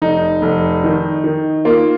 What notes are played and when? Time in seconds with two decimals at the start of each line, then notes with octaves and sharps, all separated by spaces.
0.02 F1 D#4
0.42 F1
0.84 D#3
1.24 D#3
1.65 A#3 F4